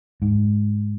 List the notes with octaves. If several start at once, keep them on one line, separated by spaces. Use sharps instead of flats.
G#2